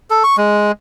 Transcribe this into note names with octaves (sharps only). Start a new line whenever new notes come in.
A4
C#6
G#3